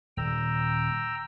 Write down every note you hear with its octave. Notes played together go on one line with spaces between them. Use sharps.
D#1 G5 A#5 E6